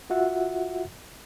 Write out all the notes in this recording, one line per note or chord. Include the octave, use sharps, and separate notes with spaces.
F4 F#4 E5 F#5